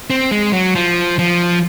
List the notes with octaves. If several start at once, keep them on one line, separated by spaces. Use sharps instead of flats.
C4
G#3
F#3
F3
F3